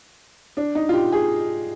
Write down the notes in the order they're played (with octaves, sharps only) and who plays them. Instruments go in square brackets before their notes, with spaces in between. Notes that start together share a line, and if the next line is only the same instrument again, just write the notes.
[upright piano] D4
D#4
F4
G4
G#4